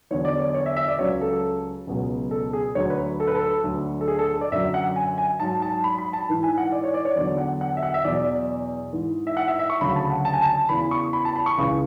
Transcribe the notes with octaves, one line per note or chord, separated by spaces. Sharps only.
E2 D3 F#3 C#5
D5
C#5
D5
C#5
E5
E5
D5
C#2 C#3 F#3 C#5
A4
C#2 B2 F#3
A4
G#4
D2 D3 F#3 C#5
B4
A4
B4
A4
D2 D3 F#3
A4
G#4
A4
D5
F#2 D3 F#3 E5
F#5
G#5
G#5
G#2 F#3 A5
A5
B5
B5
A5
G#2 E3
G#5
F#5
D5
C#5
D5
C#5
E2 D3 F#3 D5
F#5
F#5
E5
F#5
E5
E2 B2 F#3 D5
G#2 E3
E5
F#5
E5
E5
C#6
D2 C#3 F#3 B5
A5
F#5
A5
G#5
A5
E2 C#3 E3 B5
C#6
B5
A5
B5
C#6
C#2 C#3 E3